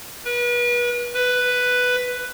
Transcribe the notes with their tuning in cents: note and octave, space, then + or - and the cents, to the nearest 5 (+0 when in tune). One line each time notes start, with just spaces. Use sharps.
B4 -35
B4 +5